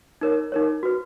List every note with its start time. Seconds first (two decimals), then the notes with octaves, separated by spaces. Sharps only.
0.21 D#4 A#4 C#5
0.52 D#4 A#4 C#5
0.83 F#4 B4